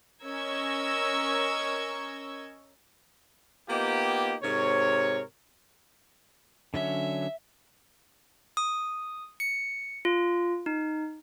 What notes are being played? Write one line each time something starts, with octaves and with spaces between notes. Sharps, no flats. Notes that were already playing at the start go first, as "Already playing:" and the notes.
C#4 A#4 D#5 C#6 E6 G#6
A#3 B3 D#4 F4 G4
G#2 C3 A#4 C#5
D3 F#3 C#4 E5
D#6
C#7
F4
D#4